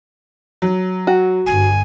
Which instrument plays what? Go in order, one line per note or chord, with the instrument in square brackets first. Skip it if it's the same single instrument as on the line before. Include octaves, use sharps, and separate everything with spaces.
[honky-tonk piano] F#3
[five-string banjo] F#4
[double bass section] G1 G2 [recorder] G#5